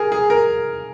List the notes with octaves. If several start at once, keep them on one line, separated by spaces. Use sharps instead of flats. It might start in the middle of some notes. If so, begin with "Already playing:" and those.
Already playing: G#4 A#4
G#4
A#4